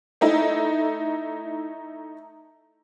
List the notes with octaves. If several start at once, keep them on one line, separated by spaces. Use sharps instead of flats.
A3 D#4 E4